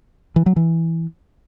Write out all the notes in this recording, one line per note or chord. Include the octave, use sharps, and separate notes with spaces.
E3
F#3
E3